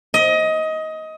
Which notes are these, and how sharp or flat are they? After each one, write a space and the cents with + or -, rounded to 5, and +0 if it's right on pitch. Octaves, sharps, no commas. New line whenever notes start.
D#5 +20